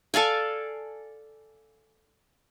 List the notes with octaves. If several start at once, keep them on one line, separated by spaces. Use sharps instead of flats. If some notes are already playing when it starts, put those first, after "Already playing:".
A4 D5 F5 G#5